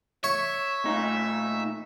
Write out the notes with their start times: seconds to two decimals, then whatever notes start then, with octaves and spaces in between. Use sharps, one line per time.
0.24 C#5 E5 C#6
0.84 A#2 A3 D#4